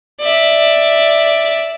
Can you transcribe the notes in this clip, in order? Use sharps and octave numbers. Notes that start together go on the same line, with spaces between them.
D5 E5